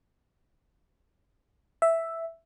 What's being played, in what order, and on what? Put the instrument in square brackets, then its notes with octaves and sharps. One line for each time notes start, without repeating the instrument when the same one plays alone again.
[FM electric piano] E5